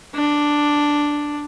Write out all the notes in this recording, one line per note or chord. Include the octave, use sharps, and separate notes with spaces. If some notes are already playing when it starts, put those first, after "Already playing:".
D4